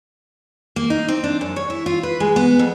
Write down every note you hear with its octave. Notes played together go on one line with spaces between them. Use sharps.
A#3
D#4
C4
D4
F#2
C#5
E4
F4
B4
G#3
B3
F2